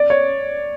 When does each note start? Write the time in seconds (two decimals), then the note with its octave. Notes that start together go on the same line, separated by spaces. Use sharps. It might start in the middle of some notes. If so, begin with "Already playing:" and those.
Already playing: D5
0.10 C#5